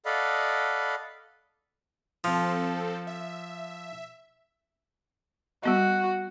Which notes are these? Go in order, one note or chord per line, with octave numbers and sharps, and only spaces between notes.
A4 D5 D#5 F5 F#5 B5
F3 C4 A4
E5
G3 B3 F#4 D#5